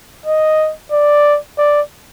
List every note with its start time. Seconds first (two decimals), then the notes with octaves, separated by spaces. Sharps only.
0.25 D#5
0.92 D5
1.58 D5